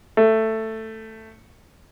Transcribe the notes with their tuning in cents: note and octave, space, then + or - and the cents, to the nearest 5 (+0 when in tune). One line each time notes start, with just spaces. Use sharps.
A3 +10